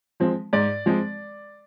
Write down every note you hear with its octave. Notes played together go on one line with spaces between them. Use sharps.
F3 G#3 C4
G#2 D5
F3 G#3 C4